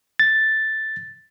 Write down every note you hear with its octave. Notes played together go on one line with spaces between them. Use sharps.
A6